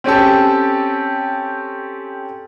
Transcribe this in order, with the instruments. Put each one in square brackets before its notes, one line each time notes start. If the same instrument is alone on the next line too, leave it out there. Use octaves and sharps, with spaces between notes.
[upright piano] C4 C#4 G4 A4